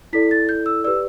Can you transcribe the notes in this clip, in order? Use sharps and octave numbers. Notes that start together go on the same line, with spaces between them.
E4 A4 D5 B6
A6
G6
E6
G4 B4 D5 E6